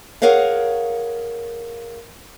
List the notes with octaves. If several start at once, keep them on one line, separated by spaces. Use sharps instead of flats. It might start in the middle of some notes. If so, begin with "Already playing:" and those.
G#4 A#4 C#5 F5 F#5